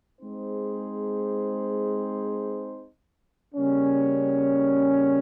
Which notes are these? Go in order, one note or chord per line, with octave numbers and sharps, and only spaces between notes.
G#3 C4 D#4 G#4 C5
C#3 G3 A#3 C#4